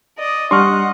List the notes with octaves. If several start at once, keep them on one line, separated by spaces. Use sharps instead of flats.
D5 D#5
G3 D4 D#5 F#5 C6 C#6 F6